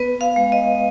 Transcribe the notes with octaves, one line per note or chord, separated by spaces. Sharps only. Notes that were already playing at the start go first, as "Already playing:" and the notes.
Already playing: B3 B4
F5
G#3
D#5